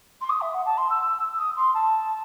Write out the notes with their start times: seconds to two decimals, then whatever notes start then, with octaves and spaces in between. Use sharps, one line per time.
0.21 C6
0.29 D#6
0.41 E5
0.53 F#5
0.65 A5
0.77 C6
0.89 E6
1.38 D#6
1.56 C6
1.74 A5